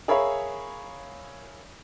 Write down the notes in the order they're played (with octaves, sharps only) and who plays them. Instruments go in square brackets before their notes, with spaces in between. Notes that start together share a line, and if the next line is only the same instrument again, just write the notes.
[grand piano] G#4 A#4 C#5 E5 F5 B5